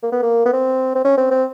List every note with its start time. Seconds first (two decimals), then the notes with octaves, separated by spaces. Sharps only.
0.02 A#3
0.12 B3
0.23 A#3
0.45 B3
0.53 C4
0.95 C4
1.05 C#4
1.17 C4
1.31 C4